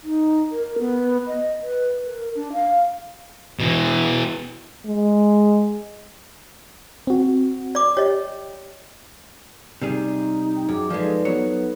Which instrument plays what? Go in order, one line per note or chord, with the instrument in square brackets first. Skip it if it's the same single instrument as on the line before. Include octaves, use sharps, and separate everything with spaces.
[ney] D#4
A#4
B3
D#5
B4
A#4
D4
F5
[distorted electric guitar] B2 E3
[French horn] G#3
[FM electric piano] C4 F#4
[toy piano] D5 D6
[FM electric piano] G4 [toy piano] C#5 D#5
[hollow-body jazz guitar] C3 G3 G#4 [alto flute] D#4
[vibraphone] G5
[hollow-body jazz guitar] F#2 [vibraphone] G#4 D6
[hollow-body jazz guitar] F3 G#3 [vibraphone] D#4 A4 B4 [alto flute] D5
[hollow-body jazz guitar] F#3 C#5 [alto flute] B3